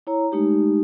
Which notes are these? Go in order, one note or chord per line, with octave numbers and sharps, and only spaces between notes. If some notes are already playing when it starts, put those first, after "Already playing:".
E4 C#5 A#5
G#3 A3 D#4 G4